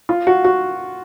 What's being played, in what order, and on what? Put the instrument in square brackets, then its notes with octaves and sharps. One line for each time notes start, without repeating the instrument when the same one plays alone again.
[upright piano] F4
F#4
F#4